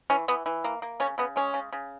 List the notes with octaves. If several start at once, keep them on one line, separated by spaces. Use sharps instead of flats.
E3 C#4
E3 B3
E3
A#3
A#3
C#3 C#4
C#3 B3
G#3 C#4
C#3
C#3